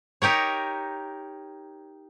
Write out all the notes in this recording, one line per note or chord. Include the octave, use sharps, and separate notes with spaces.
D#4 G4 A#4 C#5